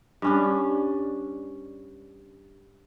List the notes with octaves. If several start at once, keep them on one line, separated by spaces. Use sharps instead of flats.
G2 C#4 D4